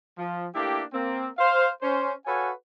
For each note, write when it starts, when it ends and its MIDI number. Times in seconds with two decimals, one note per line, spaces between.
0.18 0.47 53
0.55 0.82 57
0.55 0.82 58
0.55 0.82 62
0.55 0.82 64
0.55 0.82 67
0.93 1.28 58
0.93 1.28 60
1.38 1.69 72
1.38 1.69 77
1.82 2.12 61
1.82 2.12 72
2.26 2.51 66
2.26 2.51 69
2.26 2.51 71
2.26 2.51 73
2.26 2.51 77
2.26 2.51 80